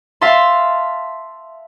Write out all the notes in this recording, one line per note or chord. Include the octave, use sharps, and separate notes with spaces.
E5 F5 A5 C6